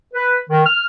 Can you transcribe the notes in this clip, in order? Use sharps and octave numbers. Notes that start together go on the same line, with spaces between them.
B4
D#3
F6